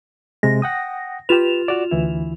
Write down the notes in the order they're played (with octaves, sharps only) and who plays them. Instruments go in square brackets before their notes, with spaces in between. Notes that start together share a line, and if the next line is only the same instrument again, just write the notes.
[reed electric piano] C3 G#3 [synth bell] A#6
[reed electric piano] F#5 G5 D#6
[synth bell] F4 E7 F7 [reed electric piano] G4 B4
[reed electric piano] F#4 D5
D2 E3 E4